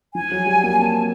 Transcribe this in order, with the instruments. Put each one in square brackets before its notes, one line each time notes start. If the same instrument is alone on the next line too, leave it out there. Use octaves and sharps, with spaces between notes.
[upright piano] F3 [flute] G#5
[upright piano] F#3
G3
A#3
[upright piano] C4 [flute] A5